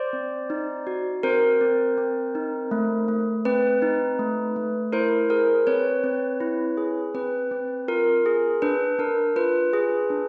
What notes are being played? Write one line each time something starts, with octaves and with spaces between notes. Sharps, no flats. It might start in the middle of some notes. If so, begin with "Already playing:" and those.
Already playing: C5 D5
C4
D#4
F#4
C4 A#4 C5
C4
C4
D#4
A3
A3
C4 B4
D#4
A3
A3
E4 A#4 C5
G#4 A#4 C5
C4 B4 C#5
C4
E4
G#4
C4 B4
C4
F4 A#4
G#4
D4 B4
D4 A#4
F4 B4
G#4
D4